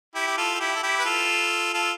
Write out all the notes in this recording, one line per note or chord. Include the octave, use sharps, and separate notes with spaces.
E4 G4
G4
F4 A4
A4
E4 G4
A4
E4 G4
B4
F4 A4
F4 A4